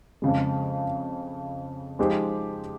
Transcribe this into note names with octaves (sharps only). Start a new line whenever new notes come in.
F2 C#3 G#3
F3 G#3 D#4 G4 C5